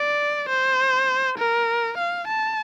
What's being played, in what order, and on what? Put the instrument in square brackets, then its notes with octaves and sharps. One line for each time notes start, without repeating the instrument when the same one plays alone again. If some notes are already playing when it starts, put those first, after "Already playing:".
Already playing: [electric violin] D5
C5
A#4
F5
A5